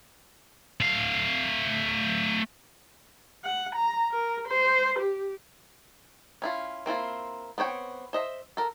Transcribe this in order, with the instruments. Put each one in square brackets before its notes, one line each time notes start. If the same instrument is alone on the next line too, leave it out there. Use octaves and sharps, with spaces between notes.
[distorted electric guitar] A3 F5
[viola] F#5
A#5
A#4
C5
G4
[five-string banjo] C#4 E4 F4
A#3 C4 E4 F4
B3 C4 C#5 G5
C5 D#5 E5
A4 A#4